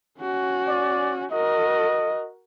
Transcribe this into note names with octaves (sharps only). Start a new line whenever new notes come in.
C#4 F#4
D5
F#4 A#4 D#5